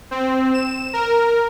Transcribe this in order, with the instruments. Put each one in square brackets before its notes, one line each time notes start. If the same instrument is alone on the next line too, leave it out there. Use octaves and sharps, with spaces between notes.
[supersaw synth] C4
E7
A#4